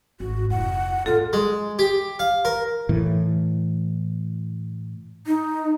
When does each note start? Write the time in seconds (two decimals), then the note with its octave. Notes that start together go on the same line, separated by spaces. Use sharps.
0.20 G#1 G#2 F#4
0.50 F1 E4 F#5
1.06 D#1 A2 F4 A4
1.33 G#3
1.79 G4
2.19 F5
2.45 A#4
2.89 A2 E3
5.26 D#4